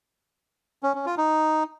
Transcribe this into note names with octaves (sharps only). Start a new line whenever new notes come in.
C#4
C#4
F4
D#4